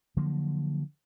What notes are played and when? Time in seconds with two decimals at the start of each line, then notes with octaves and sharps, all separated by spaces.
0.17 D3 F3 F#3 A#3